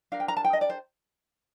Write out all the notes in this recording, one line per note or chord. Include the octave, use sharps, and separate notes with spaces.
D4 G4 A#4 F5
G5
A#5
A5
G5
D#5
D5
C5